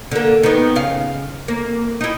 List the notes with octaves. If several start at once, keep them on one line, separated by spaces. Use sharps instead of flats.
D3 A#3
D#3 B3
C#3 F5
A#3
D#4 E4